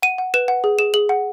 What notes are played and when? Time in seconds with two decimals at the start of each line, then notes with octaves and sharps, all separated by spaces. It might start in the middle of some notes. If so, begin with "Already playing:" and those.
0.03 F#5 D#7
0.18 F#5
0.34 B4 E7
0.48 F#5
0.64 G#4
0.79 G#4 E7
0.94 G#4 F#7
1.09 F#5